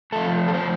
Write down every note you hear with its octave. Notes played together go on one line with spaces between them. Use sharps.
F2 F3 A3 A4
A4
C5